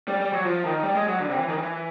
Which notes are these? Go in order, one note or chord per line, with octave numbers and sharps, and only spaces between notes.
G3
G3
F#3
F3
D#3
G3
G#3
F#3
D3
C3
E3
D#3
E3